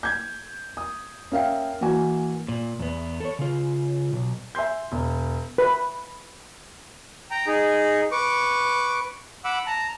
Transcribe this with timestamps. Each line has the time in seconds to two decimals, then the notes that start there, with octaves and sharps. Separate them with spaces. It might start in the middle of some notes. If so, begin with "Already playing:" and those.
0.03 G6 G#6
0.77 D#6
1.32 C#4 A#4 E5 F5 G5
1.81 E3 A#3 F#4 G#5
2.48 A#2
2.79 E2 B3
3.20 A4 C#5
3.39 C#3 F4
4.13 B1
4.55 E5 G#5 C6 G6
4.92 E1
5.58 B4
7.31 G5 A#5
7.47 D#4 G#4
8.12 B4 C#6 D6
9.45 F#5 B5 D6 E6
9.66 A5 A#5